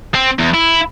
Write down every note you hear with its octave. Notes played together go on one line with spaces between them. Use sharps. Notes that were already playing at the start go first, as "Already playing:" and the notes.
C4
E2
E4